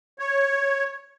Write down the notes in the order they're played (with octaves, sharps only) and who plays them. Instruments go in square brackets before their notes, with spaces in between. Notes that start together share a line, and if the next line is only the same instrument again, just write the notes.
[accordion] C#5